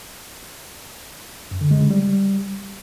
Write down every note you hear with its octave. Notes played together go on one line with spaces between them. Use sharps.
F#2
D3
G#3
C#3
G3